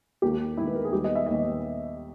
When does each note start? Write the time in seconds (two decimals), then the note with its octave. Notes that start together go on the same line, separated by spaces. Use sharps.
0.22 D#2 D#3 A#3 G4
0.57 D#2 D#3 A#3 E4
0.68 B4
0.75 A#4
0.85 G#4
0.92 D#2 D#3 G3 B3 G4
1.04 D#5
1.15 E5
1.26 D#2 D#3 G3 B3 D#5